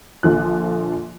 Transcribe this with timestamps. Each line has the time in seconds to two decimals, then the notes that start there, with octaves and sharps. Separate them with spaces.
0.23 A#1 D3 F3 F#6